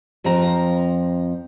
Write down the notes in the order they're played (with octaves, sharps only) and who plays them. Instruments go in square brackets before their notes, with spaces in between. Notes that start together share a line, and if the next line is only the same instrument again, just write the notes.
[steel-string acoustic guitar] F2 F3 C4 A#5